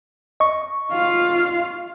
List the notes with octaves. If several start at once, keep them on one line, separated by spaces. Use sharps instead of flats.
D#5 C#6
F4 F5